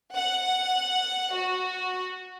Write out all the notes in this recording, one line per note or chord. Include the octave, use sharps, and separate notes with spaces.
F#5
F#4